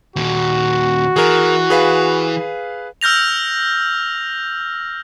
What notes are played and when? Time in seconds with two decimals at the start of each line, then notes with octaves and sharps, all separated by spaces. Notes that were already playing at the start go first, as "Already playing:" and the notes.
0.16 D#2 A#2 F#4
1.16 E3 G#4 A#4
1.70 G#4 B4 F5
3.01 E6 F6 G6 A#6 F7